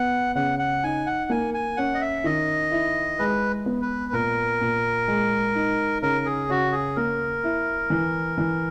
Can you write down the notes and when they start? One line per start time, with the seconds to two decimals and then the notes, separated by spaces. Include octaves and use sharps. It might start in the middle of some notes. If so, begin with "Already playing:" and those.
Already playing: B3 F#5
0.35 C#3 F#5
0.59 F#5
0.84 D#4 G#5
1.06 F#5
1.30 A#3 G#5
1.54 G#5
1.77 C#4 F#5
1.94 D#5
2.01 E5
2.24 D#3 D#5
2.71 E4
3.19 G#3 B4
3.66 B3
3.82 B4
4.13 A#2 A#4
4.61 A#2
5.08 G#3
5.55 D#4
6.02 C#3 A#4
6.26 G#4
6.49 C#3 F#4
6.72 G#4
6.96 A#3 A#4
7.44 E4
7.90 E3
8.38 E3